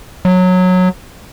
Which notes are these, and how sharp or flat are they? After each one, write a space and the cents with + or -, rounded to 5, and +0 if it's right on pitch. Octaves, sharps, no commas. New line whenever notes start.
F#3 -15